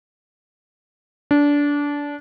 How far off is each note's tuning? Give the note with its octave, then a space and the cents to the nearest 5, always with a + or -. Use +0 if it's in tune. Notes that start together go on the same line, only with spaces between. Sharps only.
D4 -20